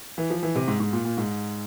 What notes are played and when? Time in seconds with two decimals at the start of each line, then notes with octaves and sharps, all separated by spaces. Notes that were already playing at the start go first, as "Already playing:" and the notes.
0.18 E3
0.30 F3
0.43 E3
0.56 C3
0.68 G#2
0.80 G#2
0.93 A#2
1.05 A#2
1.17 G#2